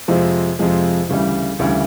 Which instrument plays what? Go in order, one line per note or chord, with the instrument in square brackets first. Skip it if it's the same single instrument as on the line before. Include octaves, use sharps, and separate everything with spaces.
[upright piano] F2 C3 F3 G#3
F2 C3 F3 G#3
D2 C#3 E3 G3
D2 C#3 E3 G3